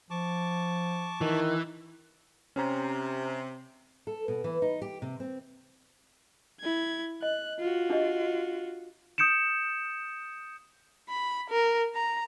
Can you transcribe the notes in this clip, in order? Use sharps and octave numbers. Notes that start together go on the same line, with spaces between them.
F3 A5 C#6 D6
D#3 E3
C3 C#4 C5 A#5
A4
B2
E3
D#4
G4
C3
C4
E4 G#6
D#5 F#6
F4 F#4
D4 G4 D#5
D#6 G6 C#7 D7 E7
B5
A#4
A#5